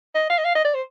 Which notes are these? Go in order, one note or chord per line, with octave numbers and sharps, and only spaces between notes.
D#5
F5
D#5
F5
D#5
D5
C5